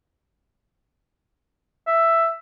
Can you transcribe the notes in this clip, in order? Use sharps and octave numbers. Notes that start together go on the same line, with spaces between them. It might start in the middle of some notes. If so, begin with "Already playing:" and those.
E5